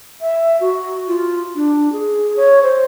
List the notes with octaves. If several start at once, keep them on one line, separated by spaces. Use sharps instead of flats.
E5
F#4
F4
D4
G#4
C#5
C5